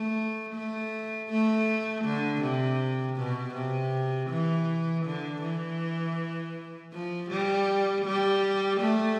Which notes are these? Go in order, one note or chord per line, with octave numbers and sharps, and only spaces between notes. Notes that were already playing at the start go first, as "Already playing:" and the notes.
Already playing: A3
A3
A3
D3
C3
B2
C3
E3
D3
E3
F3
G3
G3
A3